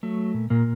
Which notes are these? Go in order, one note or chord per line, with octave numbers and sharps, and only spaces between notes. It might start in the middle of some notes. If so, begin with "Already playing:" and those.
F#3 A3
A#2
A#2 A#3